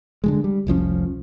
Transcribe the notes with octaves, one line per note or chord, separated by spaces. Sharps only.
D3 E3 G#3
G3
F1 C2 F3 C#4